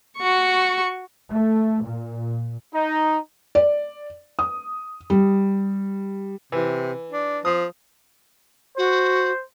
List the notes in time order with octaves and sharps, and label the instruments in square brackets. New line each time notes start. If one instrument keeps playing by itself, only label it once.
[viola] F#4 C#6
[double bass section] A3
A#2
[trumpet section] D#4
[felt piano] D5
D#6
G3
[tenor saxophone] C3 [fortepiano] E3
[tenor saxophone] D4
[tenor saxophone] F3 [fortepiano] D#6
[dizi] F#4 [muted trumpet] C5